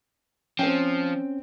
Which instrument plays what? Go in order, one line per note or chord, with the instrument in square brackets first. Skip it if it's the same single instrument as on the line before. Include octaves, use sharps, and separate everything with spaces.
[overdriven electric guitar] F3 [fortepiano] C4 G5 [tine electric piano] C#4